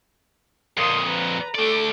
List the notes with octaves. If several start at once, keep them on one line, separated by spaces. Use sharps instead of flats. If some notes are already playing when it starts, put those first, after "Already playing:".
F2 A#2 A#4 C6 D#6
B4 A#5
A3 A4 D5 D6